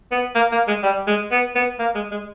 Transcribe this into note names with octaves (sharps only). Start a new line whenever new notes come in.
B3
A#3
A#3
G#3
G3
G#3
B3
B3
A#3
G#3
G#3